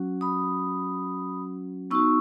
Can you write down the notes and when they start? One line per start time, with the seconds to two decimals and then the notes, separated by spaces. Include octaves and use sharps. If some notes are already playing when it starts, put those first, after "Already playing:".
Already playing: F#3 C#4 F#4
0.21 B5 D#6
1.91 B3 D#4 F#4 C#6 E6